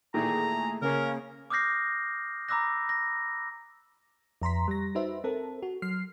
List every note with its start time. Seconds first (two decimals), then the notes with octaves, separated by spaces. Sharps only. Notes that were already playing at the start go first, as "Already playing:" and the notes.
0.14 A#2 D#3 E3 A3 G#4 A#5
0.82 C#3 A#3 C#4 A#4
1.50 D6 D#6 F6 G6 A#6 C7
2.49 A#5 B5 D6 E6 F#6 A#6
2.89 A#6
4.42 F2 A#5 C6 B6
4.68 G3 A#6
4.95 D#4 F#4 B4 C5 E5
5.24 C4 A4 A#4
5.63 F#4
5.82 F#3 F6 C7